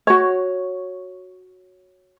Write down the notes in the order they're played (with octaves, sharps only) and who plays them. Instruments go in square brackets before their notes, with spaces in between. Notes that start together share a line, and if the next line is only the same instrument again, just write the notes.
[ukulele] F#4 C#5